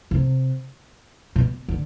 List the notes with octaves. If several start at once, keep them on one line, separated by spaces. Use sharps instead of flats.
C3
B2
D3